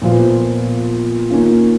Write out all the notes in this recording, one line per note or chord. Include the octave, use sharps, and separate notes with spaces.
A#2 F3 B3 F4
D#3 A#3 C#4 F4